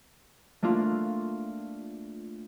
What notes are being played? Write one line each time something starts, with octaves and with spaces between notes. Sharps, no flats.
A3 A#3 D4 F4